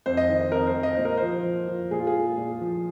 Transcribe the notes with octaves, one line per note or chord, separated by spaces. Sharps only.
F2 C5
D#5
D#3
D#5
F2 A#4
C5
F2
D#5
A#2 C5
A#4
F3 C5
F3
F3
A#2 G#4
F4
G#4
A#2
A#2
F3